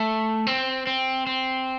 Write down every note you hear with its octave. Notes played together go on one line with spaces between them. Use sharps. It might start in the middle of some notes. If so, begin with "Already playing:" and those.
Already playing: A3
C4
C4
C4